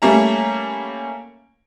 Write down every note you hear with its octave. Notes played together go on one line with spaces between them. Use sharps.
G3 A3 A#3 C#4 A#5